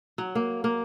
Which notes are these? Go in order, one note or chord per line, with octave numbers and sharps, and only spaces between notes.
F#3
A#3
A#3